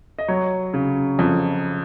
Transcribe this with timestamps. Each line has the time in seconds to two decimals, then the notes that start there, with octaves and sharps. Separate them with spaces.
0.19 D#5
0.28 F#3 C#5
0.74 C#3
1.19 F2